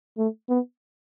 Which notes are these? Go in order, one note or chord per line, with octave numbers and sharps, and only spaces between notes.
A3
B3